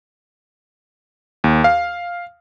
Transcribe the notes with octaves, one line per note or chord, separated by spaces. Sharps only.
D#2
F5